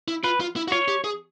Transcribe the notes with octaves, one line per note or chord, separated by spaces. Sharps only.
E4
F4 B4
F4
E4
F#4
F4 C#5
G4
G#4